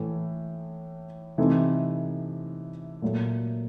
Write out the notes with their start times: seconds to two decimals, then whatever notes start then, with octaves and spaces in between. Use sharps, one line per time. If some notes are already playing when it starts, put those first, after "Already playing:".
Already playing: A2 E3 A3
1.38 C3 E3 A3 C4 D#4
3.02 A#2 F#3 A3